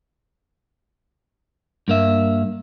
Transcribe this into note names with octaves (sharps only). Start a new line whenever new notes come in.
G2 A#3 E5